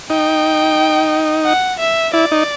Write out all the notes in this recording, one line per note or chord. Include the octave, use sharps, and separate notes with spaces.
D#4 G5
F#5
E5
E4 D5
D#4